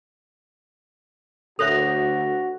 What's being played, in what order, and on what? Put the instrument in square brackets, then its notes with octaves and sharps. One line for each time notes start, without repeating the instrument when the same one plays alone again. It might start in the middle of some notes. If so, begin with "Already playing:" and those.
[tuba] D2 [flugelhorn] F#4 [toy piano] A4 C#5 E5 [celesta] F#6 A#6 F7